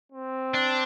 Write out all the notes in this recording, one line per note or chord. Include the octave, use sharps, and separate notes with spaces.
C4
D4